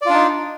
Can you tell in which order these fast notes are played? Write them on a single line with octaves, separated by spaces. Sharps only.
D5 F4 D4 D#4